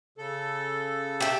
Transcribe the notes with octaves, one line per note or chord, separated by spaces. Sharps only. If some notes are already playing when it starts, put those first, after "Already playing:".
C#3 A4
G4 E5